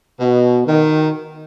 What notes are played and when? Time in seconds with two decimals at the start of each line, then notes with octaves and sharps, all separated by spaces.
0.20 B2
0.67 D#3